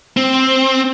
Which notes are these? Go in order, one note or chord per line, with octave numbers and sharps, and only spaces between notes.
C4